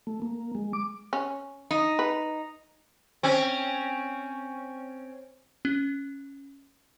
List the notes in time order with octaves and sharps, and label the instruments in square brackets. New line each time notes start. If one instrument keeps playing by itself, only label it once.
[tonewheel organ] A3
A#3
G#3
D6
[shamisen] C#4
[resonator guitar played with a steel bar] D#4
[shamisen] B4
[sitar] C4 C#4
[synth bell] C#4